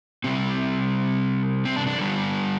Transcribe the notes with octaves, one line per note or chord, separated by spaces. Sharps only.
C3 G3 C4
C4
D4
D4
D3 G3